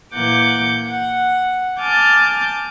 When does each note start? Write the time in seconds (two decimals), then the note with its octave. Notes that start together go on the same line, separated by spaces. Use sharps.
0.14 A#2 E3 A#3 F#5 D6 G6
0.88 F#5
1.80 G#5 A5 D6 F6 G6 A6